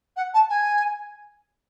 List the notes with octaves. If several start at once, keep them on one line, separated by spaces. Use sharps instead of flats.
F#5
A5
G#5